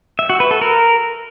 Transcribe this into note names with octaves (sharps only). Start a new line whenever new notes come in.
E5
F#4
B4
A4
A#4